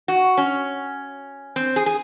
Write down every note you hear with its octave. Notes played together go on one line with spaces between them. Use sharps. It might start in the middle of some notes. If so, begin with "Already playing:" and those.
F#4
C#4
C4
G#4
G#4